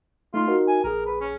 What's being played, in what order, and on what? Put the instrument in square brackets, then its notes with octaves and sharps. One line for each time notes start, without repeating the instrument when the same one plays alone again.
[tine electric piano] A3 D#4 C6 [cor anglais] F4
[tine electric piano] D#4 F#4 A#4
[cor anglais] G#5
[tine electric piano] A#1 G#4 [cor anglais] A#4
[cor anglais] B4
C#4